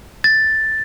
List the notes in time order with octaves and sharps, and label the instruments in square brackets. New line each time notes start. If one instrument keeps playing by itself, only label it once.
[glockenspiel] A6